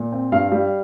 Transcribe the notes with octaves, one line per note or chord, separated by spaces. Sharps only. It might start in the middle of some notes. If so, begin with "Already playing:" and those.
Already playing: A#2
C4
G2 F5
G3